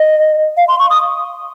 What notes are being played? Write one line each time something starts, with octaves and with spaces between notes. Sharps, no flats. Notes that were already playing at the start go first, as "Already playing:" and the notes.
Already playing: D#5
F5
C6
C#6
D#6